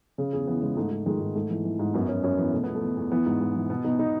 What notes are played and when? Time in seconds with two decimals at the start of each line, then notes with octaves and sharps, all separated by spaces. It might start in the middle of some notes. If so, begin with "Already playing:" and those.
0.18 C#3 G#4
0.33 E2 G#4
0.47 E3 B3
0.62 C#3 G#3
0.77 G#2 A3
0.91 G#2
1.06 D#3 G#3
1.20 G#2
1.35 G#2 A3
1.50 E3
1.65 E3
1.79 G#2
1.94 F#2 B3
2.08 F#2 C#4
2.23 F#2 C#4
2.38 E3 B3
2.53 B2 A3
2.64 E2 B3
2.75 A3
2.82 E2
2.97 E2
3.12 E3 B3
3.26 G#2
3.40 G#2
3.55 E3
3.70 B2 B3
3.84 B2 D#4
3.99 B2 D#4